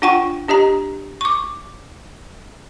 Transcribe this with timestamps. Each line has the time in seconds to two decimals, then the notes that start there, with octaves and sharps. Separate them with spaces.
0.02 D4 F4 F#5 G5 C#6
0.48 D4 G4 D#5 A#5
1.21 C#6 D6